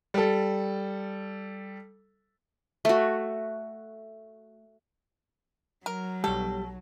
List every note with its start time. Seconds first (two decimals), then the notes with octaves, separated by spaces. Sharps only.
0.14 G3 A4
2.85 A3 F#4
5.86 F#3 A#4
6.24 B1 G3 A4 C#5